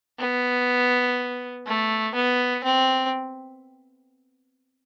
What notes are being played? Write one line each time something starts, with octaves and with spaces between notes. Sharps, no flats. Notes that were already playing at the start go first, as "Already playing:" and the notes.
B3
A3
B3
C4